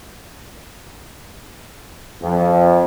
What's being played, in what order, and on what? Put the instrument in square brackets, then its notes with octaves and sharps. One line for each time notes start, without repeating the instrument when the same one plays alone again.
[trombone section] F2